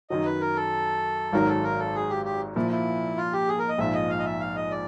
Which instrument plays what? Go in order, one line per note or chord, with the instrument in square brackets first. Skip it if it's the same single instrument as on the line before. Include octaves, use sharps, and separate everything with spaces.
[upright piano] F#2 D#3 F#3 [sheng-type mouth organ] D#5
[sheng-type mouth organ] B4
A#4
A4
[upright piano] G#1 G#2 D#3 F#3 [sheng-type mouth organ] A#4
[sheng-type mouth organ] A4
A#4
A4
G#4
G4
G4
[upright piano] A#2 F3 A#3 [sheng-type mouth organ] E4
[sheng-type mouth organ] E4
F4
G4
G#4
A#4
D#5
[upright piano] A#1 G#2 F3 [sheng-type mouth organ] E5
[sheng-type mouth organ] D#5
F5
D#5
E5
F5
D#5
D5